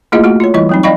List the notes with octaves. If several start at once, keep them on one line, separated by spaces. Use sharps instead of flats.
A3 A#3 E4 F4 G#4 D#5
A3 F#4 F#5
F4 C#5
E3 G3 E4 C#5 D#5 C#6
F#3 C4 D#4
D5 D#5 F5 G5 B5 C#6